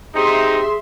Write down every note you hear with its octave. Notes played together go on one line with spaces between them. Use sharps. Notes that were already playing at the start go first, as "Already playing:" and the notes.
C4 D#4 G4 G#4 E5 C6